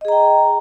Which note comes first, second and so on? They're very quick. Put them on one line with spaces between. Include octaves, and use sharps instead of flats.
D#5 G#4 A#5 G5